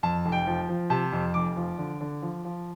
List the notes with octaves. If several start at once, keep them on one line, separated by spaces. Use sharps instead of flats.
F2 A5
F1
G5
F3
F3
C3 A5
F2
F1 D6
F3
D3
D3
F3
F3